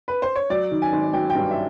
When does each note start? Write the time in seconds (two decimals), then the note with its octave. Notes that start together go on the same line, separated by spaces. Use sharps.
0.08 B4
0.22 C5
0.36 C#5
0.50 F#3 D5
0.71 D#3
0.82 G#5
0.92 G#1
1.13 F#3 G5
1.30 G5
1.35 G2
1.51 E5